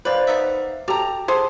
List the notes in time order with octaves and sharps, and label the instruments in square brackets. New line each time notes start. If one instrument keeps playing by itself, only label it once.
[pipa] D#3 B4 [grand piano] C5 D5 F5
[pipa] B3 D#4 E5
[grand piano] G4 D6 F7 [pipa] A4 A#5
[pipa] G#4 A4 C5